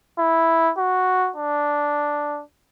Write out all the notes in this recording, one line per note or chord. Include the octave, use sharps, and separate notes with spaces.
E4
F#4
D4